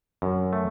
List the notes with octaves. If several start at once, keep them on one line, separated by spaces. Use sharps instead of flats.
F#2
A3